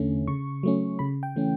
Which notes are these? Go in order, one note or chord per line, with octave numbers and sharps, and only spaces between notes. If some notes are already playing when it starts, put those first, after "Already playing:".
Already playing: E2 D3 A3 C#4
C#3 C#6
F#3 A3 C#4
C#3 B5
G5
E3 A3 C#4